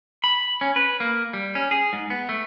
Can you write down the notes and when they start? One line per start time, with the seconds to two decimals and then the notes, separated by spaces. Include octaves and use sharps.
0.24 B5
0.61 C#4
0.76 B4
1.00 A#3
1.33 G3
1.55 C#4
1.71 G#4
1.93 G#2
2.10 B3
2.29 A3